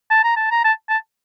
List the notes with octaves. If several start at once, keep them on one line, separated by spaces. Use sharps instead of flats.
A5
A#5
A5
A#5
A5
A5